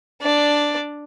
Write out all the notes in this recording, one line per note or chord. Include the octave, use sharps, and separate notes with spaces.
D4 D5